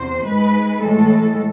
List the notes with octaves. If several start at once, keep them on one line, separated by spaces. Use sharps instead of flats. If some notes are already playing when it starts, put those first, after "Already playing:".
Already playing: E2 C3 C5
G#2 G#3 B4
A2 E3 G#3 A4